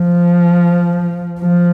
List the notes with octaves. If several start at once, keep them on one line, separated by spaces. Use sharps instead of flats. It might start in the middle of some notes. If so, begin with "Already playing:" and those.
Already playing: F3
F3